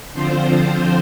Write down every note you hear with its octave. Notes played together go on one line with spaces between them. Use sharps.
D3 F3 C4 F4 C5